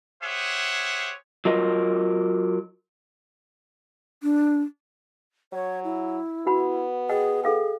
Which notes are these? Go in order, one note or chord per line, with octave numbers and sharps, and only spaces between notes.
G4 G#4 C5 C#5 E5 F#5
F#3 F4 A#4 D#5
D4
F#3 C#5
E4
B3 F#4 F#5 B5
G#4 D#5 F#5 G5
G#4 A4 F5 G5